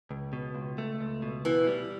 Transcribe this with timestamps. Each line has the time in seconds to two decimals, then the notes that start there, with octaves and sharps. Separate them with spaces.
0.11 C#2
0.33 B2
0.55 C#2
0.78 A3
1.01 C#2
1.22 B2
1.45 B2 E3
1.67 G3